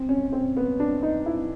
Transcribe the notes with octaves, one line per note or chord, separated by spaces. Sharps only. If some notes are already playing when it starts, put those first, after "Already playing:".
Already playing: C4
C#4
C4
B3
D4
D#4
E4